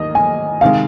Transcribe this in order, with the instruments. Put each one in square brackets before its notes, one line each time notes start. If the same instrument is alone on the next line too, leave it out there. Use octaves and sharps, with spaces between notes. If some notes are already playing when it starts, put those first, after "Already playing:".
Already playing: [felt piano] D#2 D#3 A#3 [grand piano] D#5
[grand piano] G#5
[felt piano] C3 D#3 G#3 [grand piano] F5